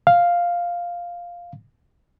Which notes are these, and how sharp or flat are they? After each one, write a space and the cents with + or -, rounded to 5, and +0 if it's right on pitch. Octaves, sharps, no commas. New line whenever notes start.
F5 +0